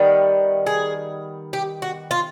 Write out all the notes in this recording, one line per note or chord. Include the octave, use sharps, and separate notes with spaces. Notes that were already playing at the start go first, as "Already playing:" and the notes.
Already playing: D#3 G3 B3
G#4
G4
F#4
F4